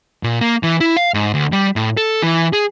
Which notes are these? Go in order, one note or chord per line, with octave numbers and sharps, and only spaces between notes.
A#2
A#3
E3
E4
F5
G#2
D2
G3
A2
A4
E3
G#4